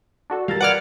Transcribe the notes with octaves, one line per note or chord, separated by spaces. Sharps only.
D4 F#4 A4
G3 A4 A#4 F5 A6
B4 D5 F#5 D6 F6 G#6